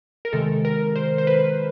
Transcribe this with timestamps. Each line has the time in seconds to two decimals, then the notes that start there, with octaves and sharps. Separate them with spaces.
0.25 A#4
0.33 C3 D#3 G#3 A4
0.65 A#4
0.96 C5
1.18 C5
1.27 B4